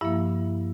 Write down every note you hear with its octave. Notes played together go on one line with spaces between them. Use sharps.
G2 F3 A#3 E4 E5